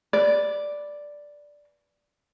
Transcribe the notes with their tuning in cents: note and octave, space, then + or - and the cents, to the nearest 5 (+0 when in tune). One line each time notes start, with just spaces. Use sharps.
B4 +0 D5 +0